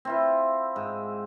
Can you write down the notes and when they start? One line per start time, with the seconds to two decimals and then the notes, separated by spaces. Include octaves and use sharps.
0.05 C4 E4 F4
0.76 G#2